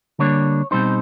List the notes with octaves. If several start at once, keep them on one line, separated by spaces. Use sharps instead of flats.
D3 G3 A#3 D4 C#5
B2 G3 C4 D#4 C5